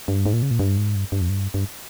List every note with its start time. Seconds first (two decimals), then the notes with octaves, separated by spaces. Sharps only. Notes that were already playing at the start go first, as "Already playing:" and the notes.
0.08 G2
0.26 G#2
0.33 A#2
0.42 C#3
0.51 A#2
0.59 G2
0.78 G#2
0.95 G2
1.12 G2
1.21 F2
1.30 G2
1.54 G2